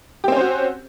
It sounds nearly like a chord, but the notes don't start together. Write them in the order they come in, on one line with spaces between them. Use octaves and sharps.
G4 C4 C#4 C5 F#4